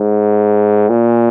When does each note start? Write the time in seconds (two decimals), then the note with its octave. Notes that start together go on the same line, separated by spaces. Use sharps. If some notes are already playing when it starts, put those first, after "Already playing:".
Already playing: G#2
0.90 A#2